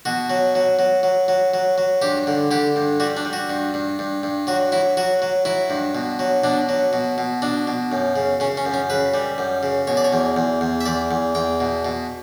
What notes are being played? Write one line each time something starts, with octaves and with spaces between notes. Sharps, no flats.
B2 F#4
F#3
F#3
F#3
F#3
F#3
F#3
F#3
G2 G4
D3
D3 G4
G2
G3 F#4
D4
G3
F#4
G2
G2
G2
G2
F#3 F#4
F#3 E4
F#3 F#4
F#3
F#3 E4
G2
B2
F#3
B2 D4
F#3
B2
B2
B2 D4
B2
F#2
C#3
C#3 C#4
C#4
F#2
C#4
C#3 B4
G3
F#2
C#3
B2 C#5
D5
C#5
E2
E2
E2
E5
E2 D5
E2
E2 G5
B2
B2